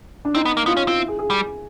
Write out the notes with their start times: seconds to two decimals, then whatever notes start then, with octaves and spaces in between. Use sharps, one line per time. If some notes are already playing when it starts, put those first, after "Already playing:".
0.25 D4
0.35 C4 D#4
0.45 B3
0.57 A#3
0.66 B3 F4
0.77 C#4
0.88 C4 F4
0.98 E4
1.08 G#4
1.19 G#4
1.30 G3